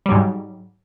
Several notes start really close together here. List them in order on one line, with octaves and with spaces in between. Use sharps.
G3 F#3 G#2